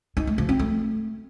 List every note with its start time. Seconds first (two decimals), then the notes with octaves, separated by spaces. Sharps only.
0.17 D#4
0.27 A3
0.38 F3
0.49 C4
0.59 A3